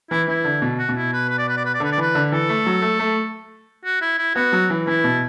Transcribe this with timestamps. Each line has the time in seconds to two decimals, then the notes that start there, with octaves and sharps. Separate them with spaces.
0.11 E3 E4
0.28 E3 E4
0.45 D3
0.62 B2
0.79 F#4
0.89 B2
0.96 E4
1.13 B4
1.29 B4
1.38 D5
1.48 B4
1.57 D5
1.65 B4
1.74 D5
1.80 D3 B4
1.92 D5
1.98 E3 B4
2.15 D3
2.32 E3 A4
2.49 A3
2.66 F#3
2.82 A3
2.99 A3
3.85 F#4
4.01 E4
4.18 E4
4.35 B3 F#4
4.52 F#3
4.70 E3
4.87 E3 E4
5.04 B2